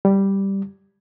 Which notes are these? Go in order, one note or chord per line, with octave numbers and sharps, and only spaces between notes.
G3